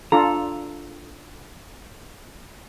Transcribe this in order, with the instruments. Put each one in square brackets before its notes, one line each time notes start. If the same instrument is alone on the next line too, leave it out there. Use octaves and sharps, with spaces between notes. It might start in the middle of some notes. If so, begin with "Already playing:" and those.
[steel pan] D4 F4 A4 [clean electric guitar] A#5